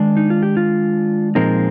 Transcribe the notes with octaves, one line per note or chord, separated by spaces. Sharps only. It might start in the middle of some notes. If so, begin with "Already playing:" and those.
Already playing: D#3 G#3 D4
D#4
F4
G4
F4
A#2 F3 G#3 C4 D#4 A#4